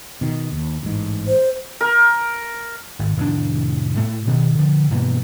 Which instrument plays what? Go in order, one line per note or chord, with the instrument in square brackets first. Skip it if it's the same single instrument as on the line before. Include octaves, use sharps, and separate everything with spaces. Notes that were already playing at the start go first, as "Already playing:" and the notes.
[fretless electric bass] B2 D#3
D#2
A1 G#2
[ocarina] C5
[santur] A#4
[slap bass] G#1
F1 A2 D#3 D4
A2 A3
B2 D#3
D3 F3
G2 B2 E3 A#3